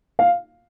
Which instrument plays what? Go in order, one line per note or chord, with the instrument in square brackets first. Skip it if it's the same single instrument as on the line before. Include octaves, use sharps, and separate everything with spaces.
[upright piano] F5